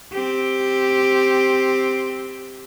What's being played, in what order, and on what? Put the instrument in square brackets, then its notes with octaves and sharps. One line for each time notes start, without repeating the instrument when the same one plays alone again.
[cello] C4 G4